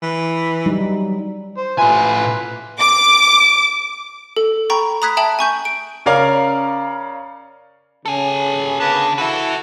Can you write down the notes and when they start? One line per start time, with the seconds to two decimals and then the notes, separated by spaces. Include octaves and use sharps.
0.02 E3
0.66 F#3 G3 D#4
1.57 C5
1.78 A2 F4 B4 E5 G#5
2.79 D6
4.36 A4
4.70 G5 A#5 B5 C#6
5.02 A#5 B5 D#6 F#6 G#6 B6
5.17 E5 G5 A5 D#6 F#7
5.39 G#5 C#6 G6
5.65 D7
6.06 C#3 C#4 A#4 D5 F5 F6
8.06 C#3 A4 G#5
8.80 D3 A#3 B3
9.18 E4 F#4 A4 B4 E5